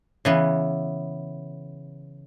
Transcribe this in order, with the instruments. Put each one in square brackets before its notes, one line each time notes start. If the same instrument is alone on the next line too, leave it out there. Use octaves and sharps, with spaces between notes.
[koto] C#3 E3 B3